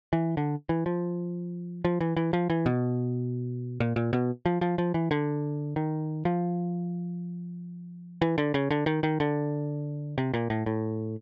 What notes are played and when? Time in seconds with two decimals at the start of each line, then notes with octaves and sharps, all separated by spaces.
0.13 E3
0.37 D3
0.69 E3
0.86 F3
1.85 F3
2.01 E3
2.17 E3
2.33 F3
2.50 E3
2.66 B2
3.80 A#2
3.96 A#2
4.13 B2
4.46 F3
4.61 F3
4.78 F3
4.94 E3
5.11 D3
5.76 D#3
6.25 F3
8.22 E3
8.38 D3
8.54 C#3
8.71 D3
8.86 D#3
9.03 D#3
9.20 D3
10.18 C3
10.34 A#2
10.50 A2
10.66 A2